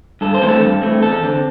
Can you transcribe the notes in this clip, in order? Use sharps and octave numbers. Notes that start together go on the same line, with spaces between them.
G2 A4
C5
E3 A3 C4
A4
G2
E3 A3 C4
E2 A4
D3 C4